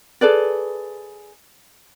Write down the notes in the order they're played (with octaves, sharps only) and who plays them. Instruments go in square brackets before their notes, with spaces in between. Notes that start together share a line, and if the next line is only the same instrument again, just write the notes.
[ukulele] G#4 A4 B4 D5